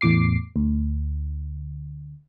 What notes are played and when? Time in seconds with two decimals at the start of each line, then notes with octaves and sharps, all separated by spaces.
0.01 E2 A2 D6 C7
0.56 D2